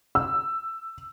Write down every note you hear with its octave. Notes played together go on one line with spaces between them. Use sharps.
E6